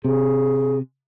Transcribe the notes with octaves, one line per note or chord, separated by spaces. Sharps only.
C3 G#4